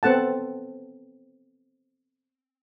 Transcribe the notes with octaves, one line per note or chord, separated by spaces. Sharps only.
B3 C4 A4 F#5 A5